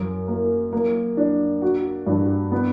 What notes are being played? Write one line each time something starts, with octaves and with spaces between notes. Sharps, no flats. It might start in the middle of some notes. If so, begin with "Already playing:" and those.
Already playing: F#2
A#3
A#3
D4
F#4
G2
B3